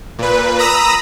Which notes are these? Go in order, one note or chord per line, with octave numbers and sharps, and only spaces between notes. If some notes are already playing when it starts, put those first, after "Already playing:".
A#2 B4
A#5 B5 D#6 E6 A#6